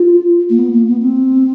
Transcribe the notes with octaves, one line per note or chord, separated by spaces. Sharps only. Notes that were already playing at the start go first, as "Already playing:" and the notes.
Already playing: F4
A#3
B3
A#3
B3
C4